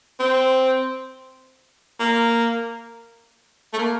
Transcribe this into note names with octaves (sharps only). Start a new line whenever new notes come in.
C4
A#3
A3
A#3